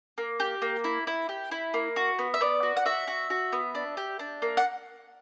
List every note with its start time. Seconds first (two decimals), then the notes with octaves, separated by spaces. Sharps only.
0.18 A#3
0.40 G4
0.62 A#3
0.84 E4
1.07 E4
1.29 G4
1.51 E4
1.74 A#3
1.96 F#4
2.19 B3
2.34 E5
2.41 B3 D5
2.63 F#4
2.77 F#5
2.86 F#4 E5
3.08 F#4
3.30 F#4
3.52 B3
3.75 D4
3.97 G4
4.19 D4
4.42 A#3
4.57 F#5